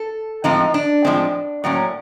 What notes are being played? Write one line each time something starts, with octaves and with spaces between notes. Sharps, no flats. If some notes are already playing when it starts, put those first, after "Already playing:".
Already playing: A4
A2 F3 G#3 C4 D#4
D4
A2 F3 G#3 C4
A2 F#3 A#3 C#4